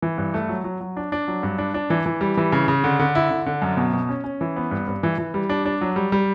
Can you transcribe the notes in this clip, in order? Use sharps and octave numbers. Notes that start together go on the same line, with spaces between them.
E3
G2
A3
F#3
F#3
F#3
D4
D4
F#3
G2
D4
D4
E3
E3
G3
E3
C#3
C#3
D3
D3
E4
D3
D3
F#2
B2
B2
C#4
C#4
E3
B3
G2
G2
E3
E3
G3
D4
D4
F#3
G3
G3